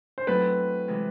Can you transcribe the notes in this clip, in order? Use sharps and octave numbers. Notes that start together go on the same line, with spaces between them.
C5
F#3 A3 C4 E4 A4 B4
C3 E3 G#3